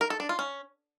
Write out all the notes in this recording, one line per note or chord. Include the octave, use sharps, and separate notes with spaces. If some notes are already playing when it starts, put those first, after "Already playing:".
A#4
A4
D4
F4
C#4